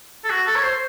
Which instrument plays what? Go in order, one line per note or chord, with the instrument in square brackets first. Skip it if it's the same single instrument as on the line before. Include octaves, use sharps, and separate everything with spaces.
[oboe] A4
F#4
A4
C#5
C5